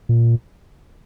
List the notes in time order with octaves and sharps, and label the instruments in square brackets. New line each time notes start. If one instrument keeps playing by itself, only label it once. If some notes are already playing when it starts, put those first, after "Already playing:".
[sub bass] A#2